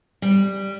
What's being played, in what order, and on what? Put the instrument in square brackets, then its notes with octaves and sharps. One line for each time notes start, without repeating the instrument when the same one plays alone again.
[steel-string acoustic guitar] G3